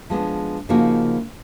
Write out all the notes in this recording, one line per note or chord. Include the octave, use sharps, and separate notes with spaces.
F3 G#3 B3 D4
C#3 F3 A#3 D#4 F#4